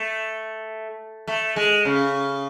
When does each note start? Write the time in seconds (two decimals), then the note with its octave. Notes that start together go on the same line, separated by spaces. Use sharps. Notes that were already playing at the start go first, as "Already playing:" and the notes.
Already playing: A3
1.27 A3
1.56 G#3
1.85 C#3